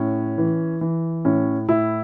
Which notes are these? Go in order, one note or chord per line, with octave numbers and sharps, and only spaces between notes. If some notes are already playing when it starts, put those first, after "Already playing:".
Already playing: A2 C#4
E3
E3
A2 C#4
A2 E4